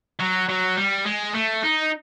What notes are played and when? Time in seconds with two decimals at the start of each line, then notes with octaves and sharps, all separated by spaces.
0.20 F#3
0.49 F#3
0.77 G3
1.06 G#3
1.34 A3
1.63 D#4